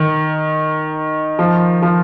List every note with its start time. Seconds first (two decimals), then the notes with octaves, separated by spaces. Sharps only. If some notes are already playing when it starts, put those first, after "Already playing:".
Already playing: D#3
1.39 F3
1.83 F3